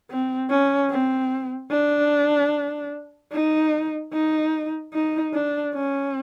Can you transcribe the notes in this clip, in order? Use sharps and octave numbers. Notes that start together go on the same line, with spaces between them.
C4
C#4
C4
D4
D#4
D#4
D#4
D4
C#4